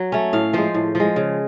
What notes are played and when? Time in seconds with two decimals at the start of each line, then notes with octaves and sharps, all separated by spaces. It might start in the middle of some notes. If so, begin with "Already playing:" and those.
Already playing: F#3
0.12 A3 C#4
0.33 A2 F5
0.53 F3 G#3 C5
0.74 A2
0.95 F3
1.00 G#3
1.16 C#3